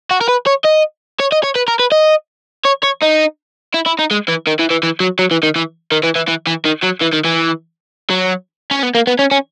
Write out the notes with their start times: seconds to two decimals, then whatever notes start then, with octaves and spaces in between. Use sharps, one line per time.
0.11 F#4
0.21 A#4
0.29 B4
0.47 C#5
0.65 D#5
1.20 C#5
1.32 D#5
1.43 C#5
1.56 B4
1.68 A#4
1.79 B4
1.92 D#5
2.65 C#5
2.83 C#5
3.02 D#4
3.74 E4
3.86 E4
3.99 D#4
4.11 G#3
4.28 E3
4.47 D#3
4.59 E3
4.70 E3
4.83 E3
5.00 F#3
5.19 F#3
5.31 E3
5.43 D#3
5.56 E3
5.92 D#3
6.03 E3
6.16 E3
6.28 E3
6.47 E3
6.65 D#3
6.83 F#3
7.01 E3
7.13 D#3
7.24 E3
8.10 F#3
8.71 C#4
8.83 B3
8.95 A#3
9.07 B3
9.19 C#4
9.31 C#4